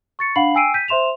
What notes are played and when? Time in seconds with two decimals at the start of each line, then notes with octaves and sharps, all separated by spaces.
0.19 C#6 A6 C#7
0.36 D4 F5 F#5 B5 C7 F#7
0.55 G5 G#5 E6 C7 D7 D#7
0.74 G6 B6 D#7
0.88 C5 E5 C6 E7 F7